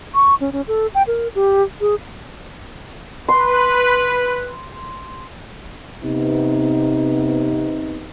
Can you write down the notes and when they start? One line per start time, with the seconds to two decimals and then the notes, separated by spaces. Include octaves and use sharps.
0.14 C#6
0.40 C#4
0.53 C#4
0.68 A4
0.95 G5
1.07 A#4
1.35 G4
1.81 G#4
3.28 B4 C6
6.03 C3 B3 D#4